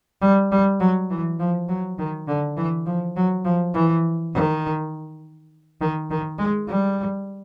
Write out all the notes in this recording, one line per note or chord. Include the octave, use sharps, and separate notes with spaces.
G3
G3
F#3
E3
F3
F#3
D#3
D3
E3
F3
F#3
F3
E3
D#3
D#3
D#3
G#3
G3